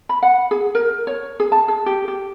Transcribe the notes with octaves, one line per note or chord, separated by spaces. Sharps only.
B5
F#5
G#4
A#4
C#5
G#4
A5
G#4
G4
G4